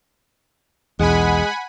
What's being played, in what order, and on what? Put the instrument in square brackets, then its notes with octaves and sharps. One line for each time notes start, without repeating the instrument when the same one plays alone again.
[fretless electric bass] B1 E2 [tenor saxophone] G#3 [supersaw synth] F#5 G#5 B5